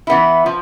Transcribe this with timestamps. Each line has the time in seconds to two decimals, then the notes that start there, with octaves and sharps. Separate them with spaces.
0.07 E3 B3 E4
0.46 F3